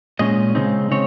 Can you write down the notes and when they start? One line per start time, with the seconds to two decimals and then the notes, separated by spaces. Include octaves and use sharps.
0.19 A#2 G#3 C#4 D#5
0.55 C#3 G#3 C4 D#4
0.91 C#3 G#3 C4 C#5